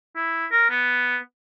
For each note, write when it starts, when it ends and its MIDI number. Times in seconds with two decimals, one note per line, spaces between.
0.16 0.46 64
0.52 0.66 70
0.70 1.17 59